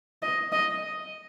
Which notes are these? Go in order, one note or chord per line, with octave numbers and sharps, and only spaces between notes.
D#5
D#5